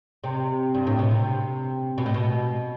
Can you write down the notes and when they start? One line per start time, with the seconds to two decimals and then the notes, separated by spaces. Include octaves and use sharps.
0.24 C3
0.75 G2
0.87 A2
0.99 B2
1.11 C3
1.98 B2
2.06 A2
2.14 B2